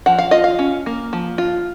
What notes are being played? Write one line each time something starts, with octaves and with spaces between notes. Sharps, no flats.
F3 F#5
F5
F4 D#5
F5
C#4
A#3
F3
F4